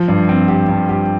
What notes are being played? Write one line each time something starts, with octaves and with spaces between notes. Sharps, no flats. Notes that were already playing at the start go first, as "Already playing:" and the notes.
Already playing: F3
G2
C4
G4
G2
G4